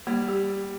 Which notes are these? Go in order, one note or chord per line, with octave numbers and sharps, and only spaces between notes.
G3 A#3
G4